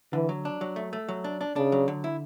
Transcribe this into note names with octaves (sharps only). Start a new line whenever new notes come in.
D3 E3
F#3
D4
F#3
A3
A3
F#3
D4
D4
C#3 D4
F#3
D3
E4